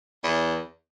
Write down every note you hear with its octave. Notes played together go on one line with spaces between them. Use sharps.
E2